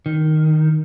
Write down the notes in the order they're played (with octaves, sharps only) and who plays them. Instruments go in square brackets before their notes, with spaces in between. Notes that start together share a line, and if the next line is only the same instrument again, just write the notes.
[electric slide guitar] D#3